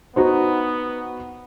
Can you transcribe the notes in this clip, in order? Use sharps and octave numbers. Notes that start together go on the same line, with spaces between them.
B3 D#4 F#4 C5